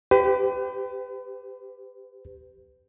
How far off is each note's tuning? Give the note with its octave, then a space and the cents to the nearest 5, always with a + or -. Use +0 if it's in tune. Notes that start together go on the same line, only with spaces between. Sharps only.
G4 +0 B4 +40